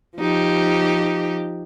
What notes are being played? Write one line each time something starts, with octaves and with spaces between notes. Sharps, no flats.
F3 D#4 G4